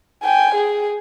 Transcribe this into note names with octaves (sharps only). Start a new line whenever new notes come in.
G5 G#5
G#4